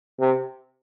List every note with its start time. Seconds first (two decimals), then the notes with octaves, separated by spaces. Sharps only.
0.20 C3